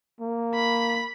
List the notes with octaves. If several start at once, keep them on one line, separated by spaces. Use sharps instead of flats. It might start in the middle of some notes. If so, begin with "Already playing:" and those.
A#3
B5